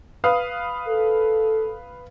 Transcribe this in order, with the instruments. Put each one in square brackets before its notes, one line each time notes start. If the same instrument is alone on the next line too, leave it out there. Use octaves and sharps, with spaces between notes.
[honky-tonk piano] B4 F5 D#6
[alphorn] A4